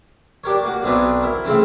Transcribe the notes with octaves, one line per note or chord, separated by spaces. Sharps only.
D4 G4 A#4 C#5
A#3 F#4
B1 C4 D4 D#4 B4 C#5
E4 A#4
A2 C#3 E3 C4 C#4